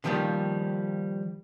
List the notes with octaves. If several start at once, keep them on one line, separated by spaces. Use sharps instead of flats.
D3 D#3 F3 G3 A#3